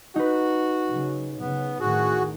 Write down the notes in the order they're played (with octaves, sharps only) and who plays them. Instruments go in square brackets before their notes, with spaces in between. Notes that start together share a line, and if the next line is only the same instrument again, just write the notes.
[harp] D#4 B4 [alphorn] F#4
[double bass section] C#3 F#3
[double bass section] C#3 [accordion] B3
[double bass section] A1 D#3 [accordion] F#4 [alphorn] G#4